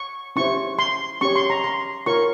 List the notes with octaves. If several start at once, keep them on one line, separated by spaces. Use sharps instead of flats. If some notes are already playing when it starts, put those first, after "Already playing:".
Already playing: C#6
C#4 E4 G4 C5 C#6
C6
C#4 G4 C#5 C#6
C6
A#5
C6
F4 A#4 C#5 C#6